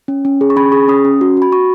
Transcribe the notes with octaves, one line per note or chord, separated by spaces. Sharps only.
C#4
C#4
G#4
C#6
C#4 B5
G#4 C#6
C#4 D#6
C#4
F#4
F#4 B5
F#4 C#6